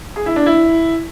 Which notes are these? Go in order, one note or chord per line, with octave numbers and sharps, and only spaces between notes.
G#4
E4
D4
E4